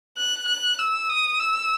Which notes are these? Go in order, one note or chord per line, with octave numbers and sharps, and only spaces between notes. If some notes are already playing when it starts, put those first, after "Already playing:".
F#6
F#6
E6
D#6
E6